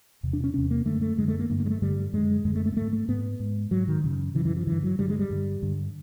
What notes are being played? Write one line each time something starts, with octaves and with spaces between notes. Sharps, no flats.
E2 C3
D4
C#4
E2 C3 C#4
A#3
F#2 D3 A3
A3
F#2 D3 G#3
A3
A#3
G2 D3 A#3
A#3
G#3
A3
G2 D3 G3
F#2 D3 G#3
F#2 D3 G#3
A3
A3
A#3
G#2 A3
A3
G#2 B3
G#2
G#2 F#3
D#3
F#2 C#3
F#2 C#3 E3
E3
F3
G2 D3 E3
F#3
G2 D3 G3
G#3
G3
G2 D3
G2 D3